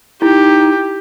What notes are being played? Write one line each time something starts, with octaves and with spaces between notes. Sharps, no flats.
D#4 E4 G4